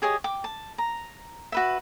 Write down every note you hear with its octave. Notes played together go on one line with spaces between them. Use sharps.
G4 G#4 C#5 D#5
G5 D6
A5
A#5
F#4 B4 E5